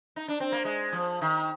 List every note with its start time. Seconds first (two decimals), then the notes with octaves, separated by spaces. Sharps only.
0.16 D#4
0.28 D4
0.40 C4
0.52 A#3
0.65 G#3
0.92 F3
1.21 D#3